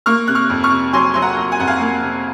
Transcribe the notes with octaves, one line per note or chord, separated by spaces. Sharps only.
A#3 C#6 F6
C3 F#6
C#6 F6
F2
C#6 F6
C3
F#3 G#5 C6
F#3 C6
F#5 A#5
F#3
G#5
F2 F#5
F5 G#5
A#3
C3